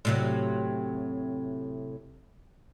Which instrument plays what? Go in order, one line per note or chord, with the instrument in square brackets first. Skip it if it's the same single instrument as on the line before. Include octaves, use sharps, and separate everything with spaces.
[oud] A2 C3 F#3